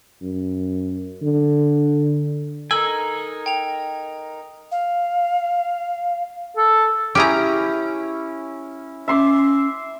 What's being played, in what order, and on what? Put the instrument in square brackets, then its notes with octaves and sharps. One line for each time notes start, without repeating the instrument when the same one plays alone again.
[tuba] F#2
D3
[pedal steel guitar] D#4 A#4 G#5 [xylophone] A4 E6
[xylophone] G5 F7
[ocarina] F5
[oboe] A4
[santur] C#4 E4 [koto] G4 G#4 A#5
[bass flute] C#4 [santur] E5 C6 D6